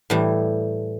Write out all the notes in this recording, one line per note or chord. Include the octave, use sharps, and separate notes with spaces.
A2 E3 G3